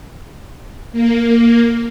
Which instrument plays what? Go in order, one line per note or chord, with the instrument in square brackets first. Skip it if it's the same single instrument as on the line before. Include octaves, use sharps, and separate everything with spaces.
[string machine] A#3